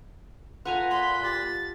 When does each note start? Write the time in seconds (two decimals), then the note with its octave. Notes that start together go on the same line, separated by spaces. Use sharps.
0.65 F4 A4 B4 F#5 G#5 A#5
0.91 A#2 D5 B5 C6 F#6
1.23 G4 A6